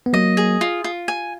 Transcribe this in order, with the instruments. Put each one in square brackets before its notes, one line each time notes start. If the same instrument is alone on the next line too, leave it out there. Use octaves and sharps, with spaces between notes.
[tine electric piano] B3
[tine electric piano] F#3 A#3 [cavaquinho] D#5
[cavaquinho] G#4
F4
F4
G#5